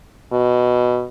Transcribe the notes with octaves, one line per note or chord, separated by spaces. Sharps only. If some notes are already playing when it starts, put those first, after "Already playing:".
B2